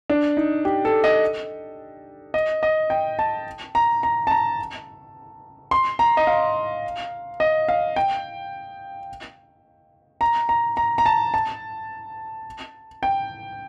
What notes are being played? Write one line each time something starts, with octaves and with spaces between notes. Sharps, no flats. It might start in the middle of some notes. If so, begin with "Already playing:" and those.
D4
D#4
G4
A4
D#5
D#5
D#5
G5
A5
A#5
A#5
A5
A#5
C6
A#5
D#5
F5
D#5
F5
G5
A#5
A#5
A#5
A#5
A5
A5
G5